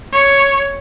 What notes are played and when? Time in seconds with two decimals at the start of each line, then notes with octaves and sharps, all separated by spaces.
0.13 C#5